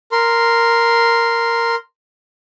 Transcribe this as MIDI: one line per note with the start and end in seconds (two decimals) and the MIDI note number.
0.12 1.75 70
0.12 1.75 84